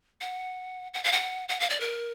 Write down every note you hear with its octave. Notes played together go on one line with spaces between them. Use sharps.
F#5
F#5
F5
F#5
F#5
F5
D5
A#4